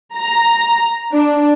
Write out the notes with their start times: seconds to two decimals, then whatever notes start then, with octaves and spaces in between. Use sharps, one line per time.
0.16 A#5
1.13 D4